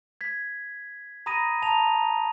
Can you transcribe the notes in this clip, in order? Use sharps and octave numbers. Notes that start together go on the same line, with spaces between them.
G#6 B6
A#5 B5 D#6 A#6 D#7
A5 A#5 F7